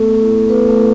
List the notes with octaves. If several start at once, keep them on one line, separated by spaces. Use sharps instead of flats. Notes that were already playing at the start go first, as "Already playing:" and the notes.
Already playing: A3 B3 A4
E4
B3 B4
A3 A4
E4